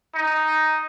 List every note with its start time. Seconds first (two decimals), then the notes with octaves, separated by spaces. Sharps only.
0.15 D#4